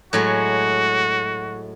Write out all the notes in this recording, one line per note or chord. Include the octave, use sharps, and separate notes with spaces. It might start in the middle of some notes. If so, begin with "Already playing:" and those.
A2 F#3 G#3 F#4